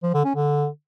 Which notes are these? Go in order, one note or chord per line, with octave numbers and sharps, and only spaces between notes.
F3
D3
C#4
D3